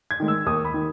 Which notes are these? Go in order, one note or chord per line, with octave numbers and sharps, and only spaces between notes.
G#6
D#3 G#3
E6
D#2 D#6
B5
D#3